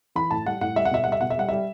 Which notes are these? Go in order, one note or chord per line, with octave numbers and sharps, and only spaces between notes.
E3 B5
A2 A5
G3 F#5
A2 F#5
G3 E5
F#5
B2 E5
G3 F#5
E5
B2 F#5
E5
G3 F#5
G3 E5